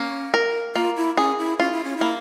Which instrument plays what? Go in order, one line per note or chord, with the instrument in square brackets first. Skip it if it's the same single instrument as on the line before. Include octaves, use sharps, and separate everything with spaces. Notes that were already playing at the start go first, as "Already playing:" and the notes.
Already playing: [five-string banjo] A#3 [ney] C#4
[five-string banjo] A#4
[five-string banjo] A#3 [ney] F4
[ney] E4
[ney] C#4 [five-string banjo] G#4
[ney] E4
[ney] C#4 [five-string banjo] F4
[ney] E4
C#4
[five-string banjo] A#3 [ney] E4